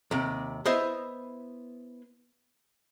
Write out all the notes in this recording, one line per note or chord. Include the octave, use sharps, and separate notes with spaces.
D#2 C3
B3 E4 C5 D#5 E5